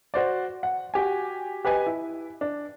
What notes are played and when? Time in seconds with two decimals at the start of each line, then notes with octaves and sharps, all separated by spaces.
0.14 F#4 C5 D5
0.63 F#5
0.94 F#4 G4 G#5
1.65 G4 B4 D#5 G#5
1.86 E4
2.41 D4